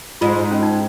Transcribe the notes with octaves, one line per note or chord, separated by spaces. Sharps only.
G#2 F4
C#4
D#4